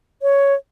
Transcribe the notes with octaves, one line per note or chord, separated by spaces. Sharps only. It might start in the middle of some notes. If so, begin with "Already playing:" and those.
C#5